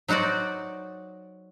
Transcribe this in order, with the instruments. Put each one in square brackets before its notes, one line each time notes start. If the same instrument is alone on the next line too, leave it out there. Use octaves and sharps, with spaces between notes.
[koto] F#3 D#4 F#4 C5 D5